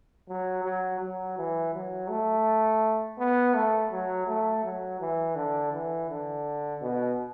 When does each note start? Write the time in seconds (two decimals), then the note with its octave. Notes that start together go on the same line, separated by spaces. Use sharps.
0.29 F#3
0.65 F#3
1.00 F#3
1.37 E3
1.74 F#3
2.09 A3
3.18 B3
3.54 A3
3.92 F#3
4.27 A3
4.64 F#3
5.00 E3
5.36 D3
5.73 E3
6.09 D3
6.81 B2